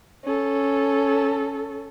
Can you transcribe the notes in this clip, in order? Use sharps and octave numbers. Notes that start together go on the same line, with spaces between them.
C#4 A4